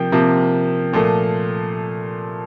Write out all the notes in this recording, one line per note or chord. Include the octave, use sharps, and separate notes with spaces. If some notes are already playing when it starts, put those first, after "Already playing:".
Already playing: C3 F3 A#3 G5
C3 F3 A#3
A#2 F3 A3